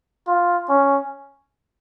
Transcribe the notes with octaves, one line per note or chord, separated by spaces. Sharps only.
F4
C#4